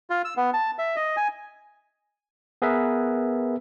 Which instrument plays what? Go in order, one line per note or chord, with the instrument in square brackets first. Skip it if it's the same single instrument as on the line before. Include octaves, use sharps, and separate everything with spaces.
[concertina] F4
E6
B3
A5
E5
D#5
G#5
[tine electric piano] B3 G#4 A#4 B4 E5